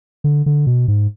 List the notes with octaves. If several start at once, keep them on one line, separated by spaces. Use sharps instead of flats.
D3
D3
B2
G#2